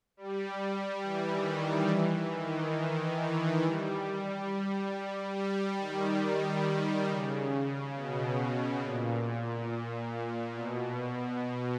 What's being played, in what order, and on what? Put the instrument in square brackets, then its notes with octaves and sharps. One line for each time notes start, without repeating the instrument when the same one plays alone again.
[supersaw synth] G3
E3
D#3
D#3
E3
D#3
D#3
E3
G3
G3
D#3
C#3
B2
A#2
B2